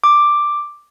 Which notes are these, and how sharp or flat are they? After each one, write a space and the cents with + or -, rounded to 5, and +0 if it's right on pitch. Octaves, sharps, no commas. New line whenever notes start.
D6 +5